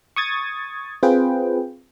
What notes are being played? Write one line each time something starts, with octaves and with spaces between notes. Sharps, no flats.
C#6 D#6 G#6 A6
C4 F4 G#4 B4 G5